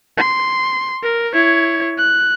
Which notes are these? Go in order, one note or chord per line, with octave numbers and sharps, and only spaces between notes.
C6
A#4
E4 C#5
F#6